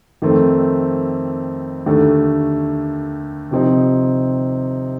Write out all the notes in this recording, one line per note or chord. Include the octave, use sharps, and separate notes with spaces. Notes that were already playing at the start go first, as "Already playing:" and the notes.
F2 D#3 A3 C4
D#2 D3 A3
C3 F3 C4 D#4